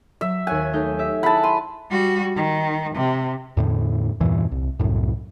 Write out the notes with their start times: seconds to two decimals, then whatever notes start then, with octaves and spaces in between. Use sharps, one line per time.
0.21 F#3 E5
0.47 D#2 C#5 G#5 F#6
0.73 A3 D#4 G6
0.99 G4 E5
1.23 E4 G#4 F#5 A5 B5
1.43 C6 D#7
1.90 G3 F#4
2.36 D#3
2.95 C3
3.57 E2 A2 D3
4.20 E2 G2 A#2 E3
4.52 C2
4.79 C2 F#2 A2